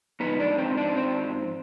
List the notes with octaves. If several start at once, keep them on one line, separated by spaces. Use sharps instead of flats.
G#2 F3 B3 D#4 B4
D4 D5
C4 C5
D4 D5
C4 C5